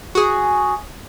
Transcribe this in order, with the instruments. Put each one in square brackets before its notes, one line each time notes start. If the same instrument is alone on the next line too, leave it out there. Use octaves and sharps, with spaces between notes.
[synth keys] F#4 G#4